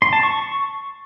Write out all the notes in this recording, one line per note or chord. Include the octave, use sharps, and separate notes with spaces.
C6
A5
C#6